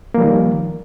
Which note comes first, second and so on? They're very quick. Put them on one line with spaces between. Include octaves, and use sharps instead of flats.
A#3 F3 G3 D#3